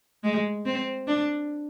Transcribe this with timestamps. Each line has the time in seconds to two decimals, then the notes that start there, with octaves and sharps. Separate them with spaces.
0.24 G#3
0.66 C4
1.07 D4